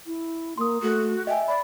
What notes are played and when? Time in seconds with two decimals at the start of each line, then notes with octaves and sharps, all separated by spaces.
0.06 E4
0.58 A#3 C6 D#6
0.82 A3 F#4
1.27 D#5 E5 G5 G#5
1.48 D5 B5